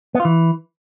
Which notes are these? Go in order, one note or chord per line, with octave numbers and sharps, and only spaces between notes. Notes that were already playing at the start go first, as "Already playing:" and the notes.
B3
F4
E3